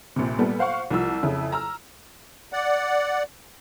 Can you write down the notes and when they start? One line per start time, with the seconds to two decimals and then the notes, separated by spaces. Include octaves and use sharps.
0.16 A#1 C3
0.39 A#2 G3 B3 A4
0.59 C5 F5 F#5 C#6
0.90 C2 F3 E6
1.23 F2 C#3 E4
1.52 A#5 E6 F6
2.53 D5 F#5